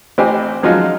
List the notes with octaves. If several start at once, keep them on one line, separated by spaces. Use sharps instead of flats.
A1 C4 G4 G#5
F3 F#3 G#3 C#4 D#4 F4